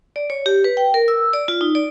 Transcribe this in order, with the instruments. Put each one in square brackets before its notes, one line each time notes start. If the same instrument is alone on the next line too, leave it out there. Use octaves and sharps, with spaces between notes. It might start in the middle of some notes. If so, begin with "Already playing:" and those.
[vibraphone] D5
C#5
G4
B4
G5
A#4
E6
D5
F4
D#4
D5